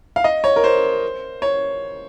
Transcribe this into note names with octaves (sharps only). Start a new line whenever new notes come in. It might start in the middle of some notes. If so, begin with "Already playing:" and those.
F5
D#5
C#5
A#4
C5
C#5